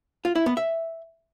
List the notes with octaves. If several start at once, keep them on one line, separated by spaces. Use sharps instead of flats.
F4
E4
B3
E5